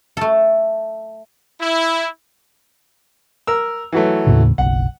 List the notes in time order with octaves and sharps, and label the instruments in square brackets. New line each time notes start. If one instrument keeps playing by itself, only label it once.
[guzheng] A3 A4
[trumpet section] E4
[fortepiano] A#4 E6
E3 F#3 A3
[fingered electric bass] D#2 A2 C#3
[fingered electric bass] F#1 B1 [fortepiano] F#5